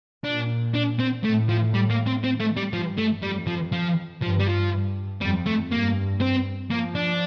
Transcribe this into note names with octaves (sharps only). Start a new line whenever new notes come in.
A#2 D4
D4
C4
A2 A3
F3
G3
A#3
C4
C4
A3
G3
G2 F3
A3
F2 G3
F3
F3
G2 F3
G3
F3
G2
F2 G3
A3
G2 A#3
C4
F3 A#3
D4